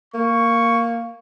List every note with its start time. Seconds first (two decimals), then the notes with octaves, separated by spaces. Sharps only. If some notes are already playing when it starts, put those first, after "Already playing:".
0.14 A#3 C#6